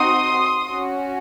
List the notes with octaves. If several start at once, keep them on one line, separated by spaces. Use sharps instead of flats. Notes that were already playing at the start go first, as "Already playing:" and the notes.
Already playing: C4 D#4 F#4 C6 D#6
C#4 F#4